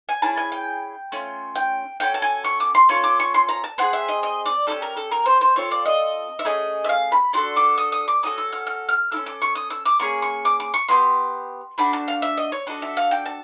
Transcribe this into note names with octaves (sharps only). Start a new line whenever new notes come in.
G#5
C#4 E4 G#4 A5
G#5
G5
A3 C#4 F4
G5
C#4 F#4 A4 G5
A5
G#5
C#6
D6
C6
C#4 F4 A4 C#6
D6
C#6
C6
A#5
A5
C4 F4 G#4 F#5
E5
D#5
D#5
D5
C#4 E4 G4 A4
A#4
A4
A#4
C5
C5
C4 F4 A4 C#5
D5
D#5
E5
A3 C#4 G#4 D#5
E5
F5
B5
D4 F#4 A4 C6
D6
D#6
D#6
D6
C#4 F#4 A4 D#6
E6
F6
F6
F6
C#4 E4 A4 E6
D6
C#6
D#6
E6
D6
A#3 C#4 G#4 C#6
C#6
D6
D6
C#6
B3 E4 G4 C6
A3 D4 F#4 B5
A5
F5
E5
D#5
C#5
D4 F#4 A4 D#5
E5
F5
G5
A5